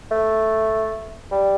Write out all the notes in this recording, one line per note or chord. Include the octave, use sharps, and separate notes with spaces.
A3
G3